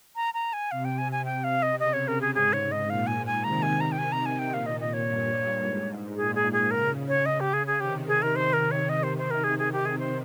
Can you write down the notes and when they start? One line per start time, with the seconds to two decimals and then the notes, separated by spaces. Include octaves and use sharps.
0.16 A#5
0.34 A#5
0.53 G#5
0.71 C3 F5
0.85 G5
0.98 G#5
1.12 G#5
1.25 G5
1.44 F5
1.63 D#5
1.80 C#3 D#5
1.93 C#5
2.08 A#4
2.21 G#4
2.35 G#2 G#4
2.53 C#5
2.72 D#5
2.90 A#2 F5
3.07 G#5
3.26 G#5
3.44 C3 D#3 A#5
3.62 G#5
3.81 A#5
3.92 G5
3.98 C3 G#5
4.12 A#5
4.26 G#5
4.39 G5
4.53 A#2 F5
4.66 D#5
4.81 D#5
4.93 C#5
5.08 G2
5.62 G#2
6.16 A#2 G#4
6.35 G#4
6.53 G#4
6.71 C#3 A#4
7.08 C#5
7.26 D#5
7.40 G4
7.53 G#4
7.67 G#4
7.80 C3 D#3 G4
8.07 G#4
8.22 A#4
8.36 C3 C5
8.53 A#4
8.71 C#5
8.89 D#5
9.03 C5
9.18 C5
9.31 A#4
9.44 G#4
9.59 G#4
9.72 G4
9.86 G#4
9.98 C5